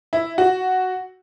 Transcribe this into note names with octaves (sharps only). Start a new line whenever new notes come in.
E4
F#4